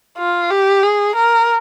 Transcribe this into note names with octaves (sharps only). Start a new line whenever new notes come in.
F4
G4
G#4
A#4